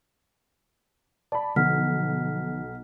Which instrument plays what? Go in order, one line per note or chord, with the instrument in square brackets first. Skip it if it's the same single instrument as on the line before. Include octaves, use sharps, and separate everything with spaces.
[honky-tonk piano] D5 B5 [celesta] A5
[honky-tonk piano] B1 [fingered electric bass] D3 F3 [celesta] F#5 F6 B6